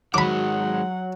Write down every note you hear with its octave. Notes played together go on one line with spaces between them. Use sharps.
D#3 F#3 G#3 F#5 B5 D6